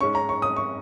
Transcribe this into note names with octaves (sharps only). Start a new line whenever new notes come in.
G#2 G#3 C#4 C#6
A#5
C#6
D#6
C#6